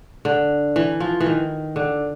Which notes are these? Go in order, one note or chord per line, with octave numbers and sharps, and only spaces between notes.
D3
E3
F3
E3
D#3
D3